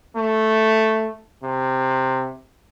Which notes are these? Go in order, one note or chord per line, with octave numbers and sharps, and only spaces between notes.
A3
C3